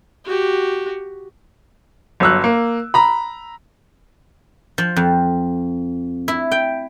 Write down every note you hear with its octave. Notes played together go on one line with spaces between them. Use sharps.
F#4 G4
G1 F#3 E6 F#6
A#3
A#5 B5
F3
F2
E4
G5